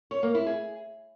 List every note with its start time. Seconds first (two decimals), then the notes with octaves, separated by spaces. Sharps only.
0.11 C#5
0.23 A#3
0.35 E4
0.46 G#4